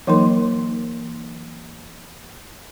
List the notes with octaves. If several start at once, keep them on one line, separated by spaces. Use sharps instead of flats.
E3 F#3 A#3 D#4 A#4 C6